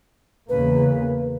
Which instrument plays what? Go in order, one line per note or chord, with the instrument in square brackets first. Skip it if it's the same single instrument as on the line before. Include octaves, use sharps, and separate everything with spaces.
[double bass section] E2 C#3 A#3 [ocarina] B4